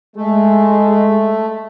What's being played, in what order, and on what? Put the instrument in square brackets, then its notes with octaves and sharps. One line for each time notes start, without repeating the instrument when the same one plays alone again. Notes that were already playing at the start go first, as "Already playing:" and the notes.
[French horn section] G#3 [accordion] A3